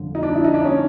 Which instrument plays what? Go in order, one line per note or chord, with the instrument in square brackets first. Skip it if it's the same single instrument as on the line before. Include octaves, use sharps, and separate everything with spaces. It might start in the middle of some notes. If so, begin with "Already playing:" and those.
Already playing: [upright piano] G1 F2 D3
D#4
D4
E4
D#4
D4
C#4